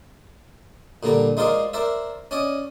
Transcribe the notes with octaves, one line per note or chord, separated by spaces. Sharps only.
A#2 D3 G3 A#5
G#3 D#4 F4 A#4 C5 D5
A#4 C5 D5 E5
C#4 D5 D#5